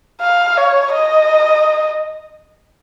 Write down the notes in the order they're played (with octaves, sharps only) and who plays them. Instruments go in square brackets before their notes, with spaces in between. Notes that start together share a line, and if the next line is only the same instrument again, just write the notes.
[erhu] F5
C#5
D#5